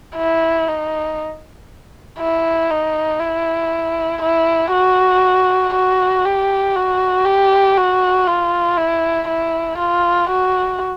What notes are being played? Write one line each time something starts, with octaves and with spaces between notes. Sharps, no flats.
E4
D#4
E4
D#4
E4
E4
F#4
F#4
G4
F#4
G4
F#4
F4
E4
E4
F4
F#4